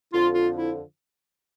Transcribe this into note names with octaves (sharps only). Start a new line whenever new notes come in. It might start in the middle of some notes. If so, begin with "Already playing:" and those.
F2 D3 F3 F4
F4
E4